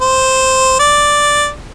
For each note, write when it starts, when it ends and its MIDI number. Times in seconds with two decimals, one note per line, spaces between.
0.01 0.75 72
0.80 1.51 74